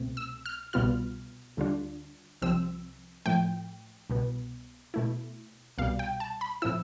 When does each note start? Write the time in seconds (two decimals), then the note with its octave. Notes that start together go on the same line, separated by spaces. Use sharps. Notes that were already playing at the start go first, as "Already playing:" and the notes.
Already playing: C2 B2 A3 C4
0.17 E6
0.46 F6
0.73 C2 B2 G3 B3 F4 F6
1.57 D2 D3 G3 D4 F4
2.42 C2 C3 F3 C4 E6
3.26 A2 F3 A3 G5
4.10 C2 B2 B3
4.94 B2 A3 E4
5.78 C2 B2 G3 F5
5.99 G5
6.20 A5
6.41 B5
6.62 A2 F3 C4 E4 E6